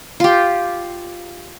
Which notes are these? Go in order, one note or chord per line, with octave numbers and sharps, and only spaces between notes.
F4 G4